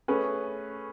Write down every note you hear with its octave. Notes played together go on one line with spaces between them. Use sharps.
A3 C#4 G#4 B4